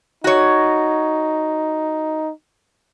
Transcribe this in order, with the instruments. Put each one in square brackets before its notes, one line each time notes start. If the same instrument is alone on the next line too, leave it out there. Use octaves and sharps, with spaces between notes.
[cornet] D#4 [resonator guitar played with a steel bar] F#4 C#5